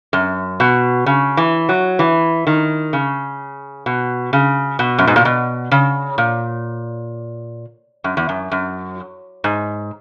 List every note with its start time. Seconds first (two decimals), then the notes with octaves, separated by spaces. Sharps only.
0.13 F#2
0.60 B2
1.06 C#3
1.37 E3
1.69 F#3
1.99 E3
2.47 D#3
2.93 C#3
3.86 B2
4.33 C#3
4.79 B2
4.98 F#2
5.07 G#2
5.16 A#2
5.25 B2
5.71 C#3
6.18 A#2
8.04 F#2
8.17 E2
8.29 F#2
8.52 F#2
9.44 G#2